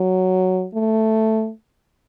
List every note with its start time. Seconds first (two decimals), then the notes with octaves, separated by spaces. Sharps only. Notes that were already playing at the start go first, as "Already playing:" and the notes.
Already playing: F#3
0.74 A3